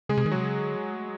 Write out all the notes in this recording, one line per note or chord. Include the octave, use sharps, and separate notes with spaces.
C#3 G#3 G#4
C3
D#3
C3 F#3 F#4
C#3
D3
G#3
A3